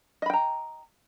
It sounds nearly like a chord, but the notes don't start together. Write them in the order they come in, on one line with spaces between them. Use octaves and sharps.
D#5 B5 G5 A#5